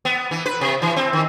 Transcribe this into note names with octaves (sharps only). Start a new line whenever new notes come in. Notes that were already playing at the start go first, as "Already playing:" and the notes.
B3
E3
B4
C3
E3
C4
D#3